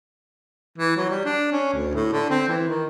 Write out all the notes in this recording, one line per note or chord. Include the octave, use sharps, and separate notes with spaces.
E3
F#3
G3
D4
C#4
D2
A2
D3
C4
E3
D#3